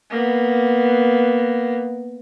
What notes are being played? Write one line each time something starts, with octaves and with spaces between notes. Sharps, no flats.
A#3 B3